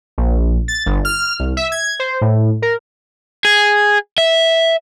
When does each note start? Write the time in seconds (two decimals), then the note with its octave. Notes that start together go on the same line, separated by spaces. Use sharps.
0.18 A#1
0.68 A6
0.86 G1
1.05 F6
1.39 C2
1.57 E5
1.72 G#6
2.00 C5
2.21 A2
2.62 A#4
3.45 G#4
4.18 E5